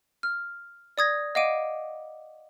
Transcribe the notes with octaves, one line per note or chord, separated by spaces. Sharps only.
F6
D5 D#6 G#6 A#6
D#5 F5 F#5 D6 D7 D#7